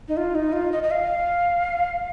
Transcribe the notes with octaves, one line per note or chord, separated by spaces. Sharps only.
D#4
F4
D#4
F4
D#5
D#5
F5